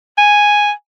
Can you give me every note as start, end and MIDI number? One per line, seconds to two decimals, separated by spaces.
0.18 0.71 80